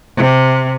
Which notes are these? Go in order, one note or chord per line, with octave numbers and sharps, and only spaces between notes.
C3